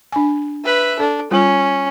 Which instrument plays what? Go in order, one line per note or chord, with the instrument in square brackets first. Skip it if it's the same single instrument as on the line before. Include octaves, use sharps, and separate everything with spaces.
[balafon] D4 G#5
[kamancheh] B4 E5
[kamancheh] D4 [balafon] A4
[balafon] G3 F4 [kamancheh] C#4